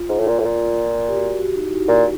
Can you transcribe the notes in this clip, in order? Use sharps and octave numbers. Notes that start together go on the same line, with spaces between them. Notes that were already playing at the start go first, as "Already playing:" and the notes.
Already playing: F4
G#2
A2
A#2
A2
A#2
G4
F#4
F#4
D#4
E4
A#2